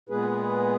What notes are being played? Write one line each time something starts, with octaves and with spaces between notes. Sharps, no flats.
A#2 G#3 B3 G#4 B4